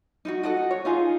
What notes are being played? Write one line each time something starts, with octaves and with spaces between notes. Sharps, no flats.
D#4 E4 F#4
F#4 A4 D#5 F#5
C#5
D#4 F4 G#4